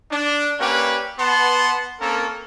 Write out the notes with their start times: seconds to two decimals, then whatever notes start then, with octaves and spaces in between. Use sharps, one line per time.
0.11 D4
0.60 A#3 C#4 G4 B4 D5
1.19 B3 B4 F#5 A5 C6
2.01 A#3 C4 C#4 A4 A#4